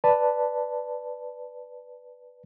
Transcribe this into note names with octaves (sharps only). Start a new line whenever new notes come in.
B4 D5 A5